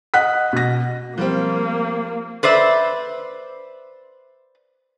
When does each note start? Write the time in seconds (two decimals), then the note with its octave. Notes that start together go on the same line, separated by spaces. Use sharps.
0.14 D#5 F#5 F#6 B6
0.53 B2 A#6
1.18 F3 G3 A#3 C4
2.43 B4 C5 D5 E5